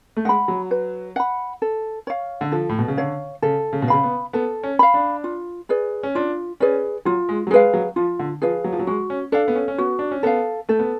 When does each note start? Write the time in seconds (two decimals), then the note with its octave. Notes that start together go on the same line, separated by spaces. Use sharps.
0.17 A3
0.25 G#3 F#5 B5
0.48 F#3
0.71 B4
1.16 F#5 B5
1.62 A4
2.07 C#5 F5
2.41 D3
2.52 F3 A4
2.69 A2
2.79 B2
2.88 C#3
2.97 D3 C#5 F5
3.42 C#3 A4
3.73 C#3
3.82 B2
3.88 C#3 F5 B5
4.03 B3
4.33 B3 A4
4.63 C#4
4.79 F5 B5
4.94 D4
5.24 F4
5.69 G#4 B4 D5
6.03 C#4
6.15 D4 F4
6.60 C#4 G#4 B4 D5
7.05 F#3 F4
7.29 G#3
7.47 F#3
7.51 G#3 G#4
7.54 B4 F5
7.74 F#3
7.96 F3 F4
8.19 D3
8.42 F3 G#4 B4 F5
8.64 F#3
8.73 F3
8.79 F#3
8.87 G#3 F#4
9.10 C#4
9.32 D4 A4 F5
9.48 B3
9.55 C#4
9.68 C#4
9.78 B3 F#4
9.99 D4
10.11 C#4
10.23 B3 A4 F5
10.69 A3 A4
10.79 B3